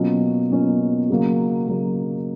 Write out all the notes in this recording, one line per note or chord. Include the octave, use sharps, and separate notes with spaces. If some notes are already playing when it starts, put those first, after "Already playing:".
Already playing: B2 F#3 A#3 C#4 F4
B2 F#3 A#3 C#4 F4
C#3 F#3 A#3
C#3 F#3 A#3